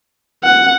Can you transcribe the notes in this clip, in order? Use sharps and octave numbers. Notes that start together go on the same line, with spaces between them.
F#5